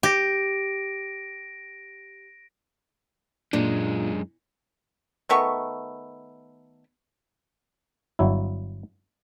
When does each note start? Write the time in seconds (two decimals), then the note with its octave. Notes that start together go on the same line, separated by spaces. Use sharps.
0.03 G4 A#6 D7
3.53 F#2 A#2 G#3 D4
5.29 D#3 A3 B3 C#6
8.19 G1 F#3 E4